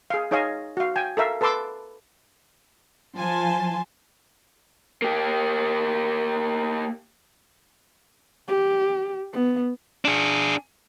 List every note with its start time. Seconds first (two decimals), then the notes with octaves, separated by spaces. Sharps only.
0.10 G#4 F5
0.31 D#4 G#4 C#5 D#5 F5 G#5
0.77 F#4 F5
0.96 G5 G#5
1.17 A4 A#4 E5 F5
1.41 A4 B4 A5 C6 D6 E6
3.18 F3 G#5 A5 C6
5.02 A#3 G4
8.48 G4
9.33 B3
10.05 D4 G#4